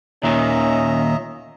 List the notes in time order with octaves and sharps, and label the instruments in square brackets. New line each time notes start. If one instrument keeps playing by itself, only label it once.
[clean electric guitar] D#2 A#2 D#3 [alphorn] C#4 [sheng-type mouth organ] D#5 E5 A#5